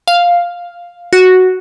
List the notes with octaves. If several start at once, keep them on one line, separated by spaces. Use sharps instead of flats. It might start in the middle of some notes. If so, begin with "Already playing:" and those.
F5
F#4